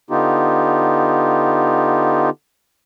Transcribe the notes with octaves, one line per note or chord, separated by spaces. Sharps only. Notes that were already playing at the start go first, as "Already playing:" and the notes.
D3 B3 D#4 F4 G4